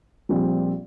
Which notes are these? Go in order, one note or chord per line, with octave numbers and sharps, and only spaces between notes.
A#1 A#2 G3 C4